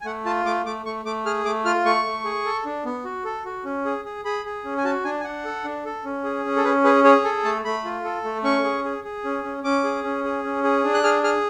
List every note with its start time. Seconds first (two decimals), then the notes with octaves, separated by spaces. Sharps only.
0.01 G#5
0.05 A3 F#5
0.25 F4 A5
0.45 A3 D6
0.66 A3 D6
0.85 A3 C#6
1.05 A3 D6
1.26 G#4 F6
1.45 A3 D6
1.65 F4 F6
1.85 A3 C#6
2.05 A3
2.25 G#4
2.45 A4
2.65 D4
2.85 B3
3.05 F#4
3.24 A4
3.45 F#4
3.65 C#4
3.85 G#4
4.05 G#4
4.25 G#4 B5
4.45 G#4
4.65 C#4
4.77 G#5
4.84 F#4 A5
5.04 D4 G#5
5.21 G#5
5.24 D4 F#5
5.45 A4
5.64 D4
5.85 A4
6.04 C#4
6.24 G#4
6.45 C#4
6.56 A4
6.64 C#4 B4
6.84 G#4 B4
7.04 G#4 C#5
7.24 A4 G#5
7.44 A3 A5
7.64 A3 B5
7.85 F4
8.05 A4
8.24 A3
8.44 C#4 C#6
8.64 G#4
8.84 G#4
9.04 G#4
9.24 C#4
9.43 C#4
9.64 C#4 D6
9.84 G#4
10.04 C#4
10.24 G#4
10.44 C#4
10.63 G#4
10.84 D4
10.94 F#6
11.03 G#4 F6
11.23 G#4 F6